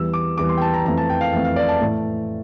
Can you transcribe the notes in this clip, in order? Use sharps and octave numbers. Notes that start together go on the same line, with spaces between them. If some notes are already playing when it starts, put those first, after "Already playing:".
Already playing: E2 E3 G3 E6
D6
E2 E3 G3 D6
C6
G5
A5
A#5
F2 E3 A3 A#5
A5
G5
F5
F2 E3 A3 E5
F5
D5
A5
A2 E3 A3